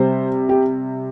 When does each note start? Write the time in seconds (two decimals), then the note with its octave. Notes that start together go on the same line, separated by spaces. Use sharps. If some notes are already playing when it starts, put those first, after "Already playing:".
Already playing: C3 G3 C5
0.49 G4